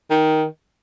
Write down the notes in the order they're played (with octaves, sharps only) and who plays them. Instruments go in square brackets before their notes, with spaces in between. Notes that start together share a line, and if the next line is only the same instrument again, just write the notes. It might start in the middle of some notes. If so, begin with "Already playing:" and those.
[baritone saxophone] D#3